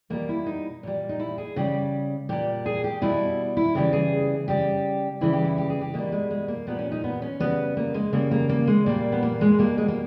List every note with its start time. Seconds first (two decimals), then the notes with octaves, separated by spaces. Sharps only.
0.10 B2 G3 A#3
0.29 E4
0.46 D#4
0.83 A#2 G3
1.09 D#4
1.20 E4
1.38 G#4
1.56 C#3 G3 G4
2.29 A#2 G3 G4
2.66 G#4
2.84 G4
3.02 B2 G3 E4
3.57 E4
3.75 C#3 E3 G3 G4
3.93 G#4
4.48 C#3 G3 G4
5.21 C#3 E3 G3 E4
5.33 G4
5.45 E4
5.58 G4
5.70 G#4
5.81 G4
5.94 B2 G3 A#3
6.12 G#3
6.31 G#3
6.48 A#3
6.67 A#2 G3 B3
6.79 C#4
6.92 D#4
7.04 B3
7.22 C#4
7.40 C#3 G3 B3
7.77 A#3
7.94 G#3
8.13 C#3 G3 A#3
8.31 A#3
8.49 A#3
8.67 G#3
8.86 A#2 G3 A#3
9.12 B3
9.22 A#3
9.41 G#3
9.58 B2 G3 A#3
9.78 G#3
9.88 A#3